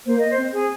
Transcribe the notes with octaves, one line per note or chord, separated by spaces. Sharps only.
A#3 C5
D#5
C5
C4
G#4